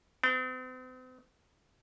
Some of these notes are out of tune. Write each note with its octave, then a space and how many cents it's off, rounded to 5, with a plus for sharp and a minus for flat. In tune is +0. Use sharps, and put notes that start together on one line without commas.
C4 -45